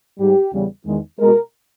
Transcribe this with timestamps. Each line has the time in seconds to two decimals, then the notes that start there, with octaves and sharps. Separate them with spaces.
0.19 G#2 G3 G4
0.53 E2 C#3 G3
0.86 E2 D#3 G#3
1.19 B2 G#3 A#4